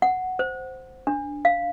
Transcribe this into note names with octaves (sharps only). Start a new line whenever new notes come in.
F#5
C5
D4
F5